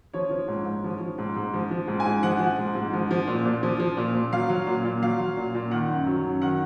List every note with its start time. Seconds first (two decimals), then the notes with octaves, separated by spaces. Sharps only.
0.14 F3 C#5
0.31 F3
0.48 G#2
0.66 G#2
0.84 F3
1.01 F3
1.18 G#2
1.36 G#2
1.54 F3
1.71 F3
1.88 G#2
2.00 G#5
2.06 G#2
2.23 F3 F#5
2.40 F3
2.58 G#2
2.75 G#2
2.93 F3
3.11 F3
3.27 A#2
3.45 A#2
3.63 F3
3.80 F3
3.97 A#2
4.15 A#2
4.32 F#3 F5
4.49 F#3
4.67 A#2
4.85 A#2
5.02 F#3 F5
5.20 F#3
5.37 A#2
5.55 A#2
5.71 D#3 F#5
5.90 F#2
6.07 F#3
6.24 F#2
6.42 D#3 F#5